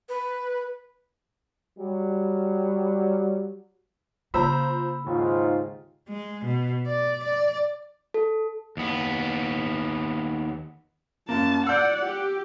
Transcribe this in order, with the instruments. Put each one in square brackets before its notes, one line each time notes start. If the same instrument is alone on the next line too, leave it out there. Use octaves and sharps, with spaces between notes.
[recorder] B4
[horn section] F#3 G3
[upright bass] C#3 A#3 [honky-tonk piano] F4 C5 A#5 [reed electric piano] B5 E6
[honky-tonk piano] D#2 [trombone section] G#2 F4
[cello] G#3
B2
D5
D5
[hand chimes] A4
[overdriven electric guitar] D#2 B3
[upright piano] F#2 A#3 [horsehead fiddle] A5
[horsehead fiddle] D5 F#5 [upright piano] E6 G6
[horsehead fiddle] G4